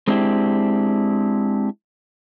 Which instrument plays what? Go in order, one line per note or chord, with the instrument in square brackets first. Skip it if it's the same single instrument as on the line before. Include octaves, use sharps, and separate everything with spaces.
[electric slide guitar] G#3 C4 D4 E4 G4